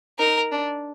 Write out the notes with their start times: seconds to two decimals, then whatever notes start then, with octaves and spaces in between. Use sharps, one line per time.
0.19 D#4 A#4
0.51 D4